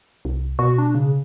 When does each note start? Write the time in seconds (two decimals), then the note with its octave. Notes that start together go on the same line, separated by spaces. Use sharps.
0.25 C2
0.59 B2 F#4
0.78 D4
0.95 C#3